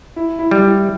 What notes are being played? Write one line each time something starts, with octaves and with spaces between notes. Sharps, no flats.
E4
E4
G3
E4